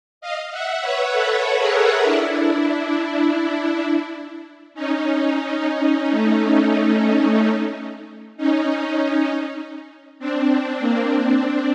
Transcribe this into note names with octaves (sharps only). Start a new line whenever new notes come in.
D#5 F5
E5 F#5
B4 C#5
A4 B4
G#4 A#4
D4 E4
C#4 D#4
C#4 D#4
A3
C#4 D#4
C4 D4
C4 D4
A#3 C4
C4 D4